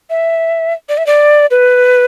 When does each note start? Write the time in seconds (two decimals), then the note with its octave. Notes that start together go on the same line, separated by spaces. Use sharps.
0.10 E5
0.89 D5
0.98 E5
1.07 D5
1.51 B4